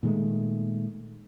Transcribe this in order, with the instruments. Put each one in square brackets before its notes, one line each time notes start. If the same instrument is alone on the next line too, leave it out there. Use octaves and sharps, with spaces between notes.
[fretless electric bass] A#2 D#3 G#3 A3